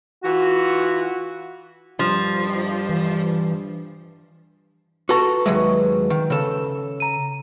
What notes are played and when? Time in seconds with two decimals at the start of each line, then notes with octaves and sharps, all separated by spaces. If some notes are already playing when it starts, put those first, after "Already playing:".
0.24 E3 F4 F#4
1.99 G2 F3
2.89 E3
5.09 F#4 A4 B4 A#5 C#6
5.46 D#2 F#3 G#3 B4 E5
6.10 D#3
6.30 C#3 A4
7.00 A#5 D#7